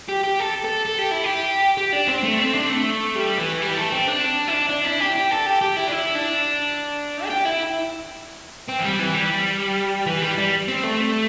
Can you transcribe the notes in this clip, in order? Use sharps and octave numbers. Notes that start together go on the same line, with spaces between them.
G4
G4
A4
A4
A4
G4
E4
G4
G4
D4
C4
A3
C4
D4
A3
G3
E3
G3
A3
C4
D4
E4
D4
D4
E4
G4
G4
A4
G4
G4
E4
D4
E4
D4
A4
G4
E4
C4
E3
G3
E3
G3
E3
G3
G3
C4
A3